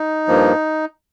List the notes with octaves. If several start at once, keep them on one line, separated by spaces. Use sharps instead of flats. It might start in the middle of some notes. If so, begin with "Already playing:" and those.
Already playing: D#4
G2 F3 A#3